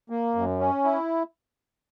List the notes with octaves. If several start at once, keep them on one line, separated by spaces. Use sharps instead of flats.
A#3
F#2
C#4
E4